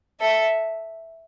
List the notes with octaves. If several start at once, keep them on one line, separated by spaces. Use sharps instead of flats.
A4 E5